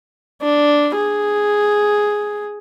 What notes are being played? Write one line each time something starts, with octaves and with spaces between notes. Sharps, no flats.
D4
G#4